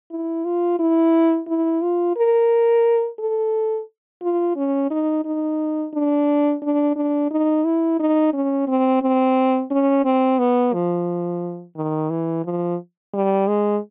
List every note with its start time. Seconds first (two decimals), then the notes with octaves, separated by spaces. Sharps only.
0.11 E4
0.45 F4
0.79 E4
1.48 E4
1.82 F4
2.16 A#4
3.19 A4
4.22 F4
4.56 C#4
4.91 D#4
5.25 D#4
5.94 D4
6.62 D4
6.96 D4
7.31 D#4
7.65 E4
8.00 D#4
8.33 C#4
8.68 C4
9.02 C4
9.71 C#4
10.05 C4
10.39 B3
10.73 F3
11.76 D#3
12.10 E3
12.45 F3
13.14 G3
13.47 G#3